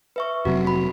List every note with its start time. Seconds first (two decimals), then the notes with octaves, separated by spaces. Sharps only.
0.16 B4 E5 C#6
0.45 F1 C3 F#3 F#4
0.67 B5